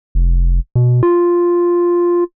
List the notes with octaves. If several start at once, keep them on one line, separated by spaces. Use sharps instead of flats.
F1
B2
F4